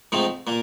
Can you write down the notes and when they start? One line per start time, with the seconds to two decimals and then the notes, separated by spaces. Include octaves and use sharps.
0.12 G#2 F3 A3 C4 D#4
0.47 A#2 A#3